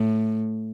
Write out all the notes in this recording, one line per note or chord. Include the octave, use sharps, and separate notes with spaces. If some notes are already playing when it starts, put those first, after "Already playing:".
Already playing: A2